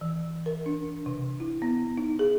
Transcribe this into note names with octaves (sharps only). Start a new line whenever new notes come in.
E3
A#4
D4
C3
E4
B3
D#4
G#4